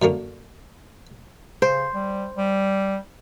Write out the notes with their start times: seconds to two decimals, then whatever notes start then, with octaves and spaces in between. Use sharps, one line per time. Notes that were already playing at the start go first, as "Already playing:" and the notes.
0.02 F#2 D3 A#3 C#4
1.62 C#3 C5
1.94 G3
2.37 G3